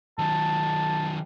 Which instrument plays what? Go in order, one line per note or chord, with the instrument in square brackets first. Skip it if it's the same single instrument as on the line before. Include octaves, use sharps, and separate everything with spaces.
[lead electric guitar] D#3 F#3 [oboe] A5